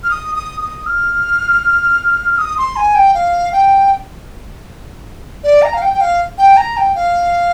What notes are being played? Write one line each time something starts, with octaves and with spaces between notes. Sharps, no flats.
F6
D#6
D#6
D#6
F6
D#6
C6
G#5
G5
F5
G5
D5
A#5
F5
G5
G5
F5
G5
A#5
G5
F5